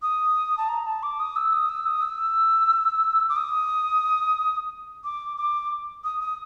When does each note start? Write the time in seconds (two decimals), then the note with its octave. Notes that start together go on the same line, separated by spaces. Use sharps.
0.02 D#6
0.57 A5
0.69 A#5
0.86 A5
1.03 D6
1.20 D#6
1.36 E6
1.53 D#6
1.69 E6
1.86 D#6
2.02 E6
3.29 D6
3.36 D#6
5.04 D6
5.37 D6
6.04 D#6
6.21 D#6